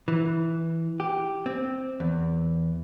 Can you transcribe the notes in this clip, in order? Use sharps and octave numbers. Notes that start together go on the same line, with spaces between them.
E3
G4
C4
E2